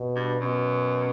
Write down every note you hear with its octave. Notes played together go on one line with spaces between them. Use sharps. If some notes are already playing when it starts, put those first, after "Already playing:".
Already playing: B2
G2
F#2 B2